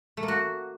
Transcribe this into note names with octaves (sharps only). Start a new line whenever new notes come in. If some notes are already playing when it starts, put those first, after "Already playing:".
A3
A#3
F#4